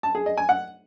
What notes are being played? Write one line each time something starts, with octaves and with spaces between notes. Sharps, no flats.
A5
G#4
D#5
G#5
F#5